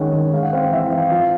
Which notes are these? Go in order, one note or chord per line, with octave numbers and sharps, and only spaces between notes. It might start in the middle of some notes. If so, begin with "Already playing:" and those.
Already playing: D#3 G#3 C#4 D4 F#5 G#5
D#3
G#3 F5
F#5
C4 F5
E3 E5
F5
E3
F5
F3 F5